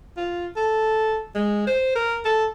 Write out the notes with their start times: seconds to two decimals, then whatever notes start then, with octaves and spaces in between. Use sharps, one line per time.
0.17 F4
0.56 A4
1.35 G#3
1.67 C5
1.95 A#4
2.25 A4